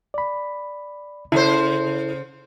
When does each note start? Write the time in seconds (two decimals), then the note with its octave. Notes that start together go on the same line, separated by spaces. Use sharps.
0.14 D5 B5
1.32 C#3 E4 A4 C5